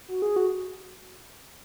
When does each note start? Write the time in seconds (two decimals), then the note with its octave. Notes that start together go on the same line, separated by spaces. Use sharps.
0.08 F#4
0.22 G#4
0.36 F#4